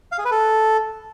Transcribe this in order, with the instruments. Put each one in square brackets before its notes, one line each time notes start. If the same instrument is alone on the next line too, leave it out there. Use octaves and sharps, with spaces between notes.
[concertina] F5
G#4
B4
A4